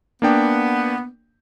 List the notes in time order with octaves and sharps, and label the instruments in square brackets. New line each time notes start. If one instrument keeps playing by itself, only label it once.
[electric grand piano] A#3 D4 G5 [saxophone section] B3